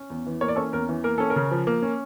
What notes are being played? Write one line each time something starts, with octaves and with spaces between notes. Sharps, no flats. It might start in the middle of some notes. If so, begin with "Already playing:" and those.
Already playing: C#4
E2
E3
A#3 C#5
D5
C#4 A4 C#5
E2 A#4
E3
A#3 A#4
C#4 A4
A#4
C#3
F3
A#3
C#4